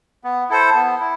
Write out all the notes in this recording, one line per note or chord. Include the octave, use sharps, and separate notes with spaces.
B3
E4 A4 C5
B3
E4